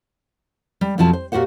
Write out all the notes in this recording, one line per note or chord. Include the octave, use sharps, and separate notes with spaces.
G3
F2 B2 F3 F#3 A5
C5
A#2 F#4 G4 C5 F#5